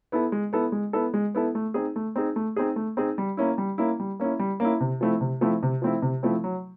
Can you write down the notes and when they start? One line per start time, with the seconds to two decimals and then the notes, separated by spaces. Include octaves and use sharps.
0.12 B3 E4 A4
0.32 G#3
0.53 B3 E4 A4
0.72 G#3
0.93 B3 E4 A4
1.14 G#3
1.35 B3 E4 A4
1.55 A3
1.74 C4 D#4 G#4
1.96 A3
2.16 C4 D#4 G#4
2.36 A3
2.56 C4 D#4 G#4
2.76 A3
2.97 C4 D#4 G#4
3.18 G3
3.37 A#3 C#4 E4
3.58 G3
3.78 A#3 C#4 E4
4.00 G3
4.20 A#3 C#4 E4
4.39 G3
4.60 A#3 C#4 E4
4.80 C3
5.01 F3 A3 C4 E4
5.21 C3
5.41 F3 A3 C4 E4
5.63 C3
5.82 F3 A3 C4 E4
6.02 C3
6.23 F3 A3 C4 E4
6.44 F#3